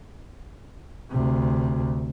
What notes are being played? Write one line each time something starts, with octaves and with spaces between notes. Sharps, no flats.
D2 C3